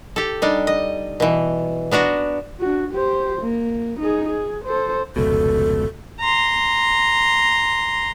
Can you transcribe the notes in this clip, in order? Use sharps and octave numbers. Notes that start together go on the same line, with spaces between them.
G4 A4
G3 D4 D#4
D#5
B2 E3
B3 D4 F#4 A#5
D4 F#4
G4 C5
A#3
D#4 G#4
G#4
A4 C5
F1 C#2 B2 A4
A#5 C6